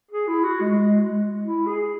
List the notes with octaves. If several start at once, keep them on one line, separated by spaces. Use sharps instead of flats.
G#4
E4
F#4
G#3
G#3
G#3
E4
G#4